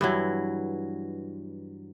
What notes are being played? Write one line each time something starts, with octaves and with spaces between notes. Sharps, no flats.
G2 E3 F#3